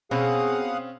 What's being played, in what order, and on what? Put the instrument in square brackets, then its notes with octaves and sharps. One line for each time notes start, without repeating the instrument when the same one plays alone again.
[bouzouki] B2 [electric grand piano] C4 C#4 [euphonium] G#4 [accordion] F5 F#5 D#6